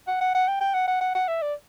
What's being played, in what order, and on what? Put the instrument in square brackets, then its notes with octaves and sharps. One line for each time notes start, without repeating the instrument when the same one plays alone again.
[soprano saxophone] F#5
F#5
F#5
G5
G5
F#5
F#5
F#5
F#5
E5
D5